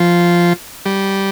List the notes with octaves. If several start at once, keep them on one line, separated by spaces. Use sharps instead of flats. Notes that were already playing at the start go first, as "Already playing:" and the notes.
Already playing: F3
G3